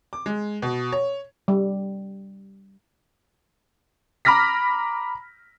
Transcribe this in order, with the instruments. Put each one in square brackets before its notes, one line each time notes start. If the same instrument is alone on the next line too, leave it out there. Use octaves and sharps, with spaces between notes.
[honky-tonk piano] D6
G#3
B2
C#5
[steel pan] G3
[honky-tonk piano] A#5 B5 D6 F6 A#6 B6